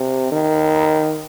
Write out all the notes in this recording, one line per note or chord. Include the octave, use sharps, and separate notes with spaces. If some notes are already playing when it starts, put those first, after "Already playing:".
Already playing: C3
D#3